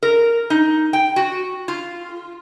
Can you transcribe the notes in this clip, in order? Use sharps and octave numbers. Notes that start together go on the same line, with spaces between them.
A#4
D#4
G5
F#4
F4